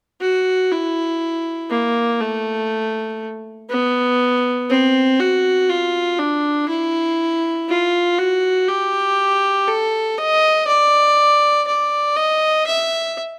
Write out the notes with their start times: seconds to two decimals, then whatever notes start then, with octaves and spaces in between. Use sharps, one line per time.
0.21 F#4
0.71 E4
1.70 A#3
2.20 A3
3.70 B3
4.70 C4
5.19 F#4
5.69 F4
6.19 D4
6.69 E4
7.68 F4
8.18 F#4
8.68 G4
9.68 A4
10.18 D#5
10.67 D5
11.67 D5
12.17 D#5
12.67 E5